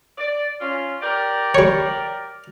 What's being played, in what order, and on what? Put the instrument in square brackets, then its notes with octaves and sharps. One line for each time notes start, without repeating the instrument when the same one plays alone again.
[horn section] D5
C#4 F4
G4 A#4 D5
[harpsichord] G3 C#5